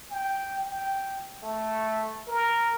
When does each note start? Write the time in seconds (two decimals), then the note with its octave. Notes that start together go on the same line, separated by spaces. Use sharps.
0.11 G5
0.66 G5
1.43 A3
2.28 A#4